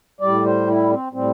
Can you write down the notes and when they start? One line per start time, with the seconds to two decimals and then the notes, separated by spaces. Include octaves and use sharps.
0.21 A2 G3 D5
0.45 C5
0.67 E4
0.91 C4
1.13 A2 G3 C4